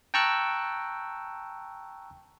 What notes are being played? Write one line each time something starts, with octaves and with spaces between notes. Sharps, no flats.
G5 A5 A#5 C#6 E6 F#6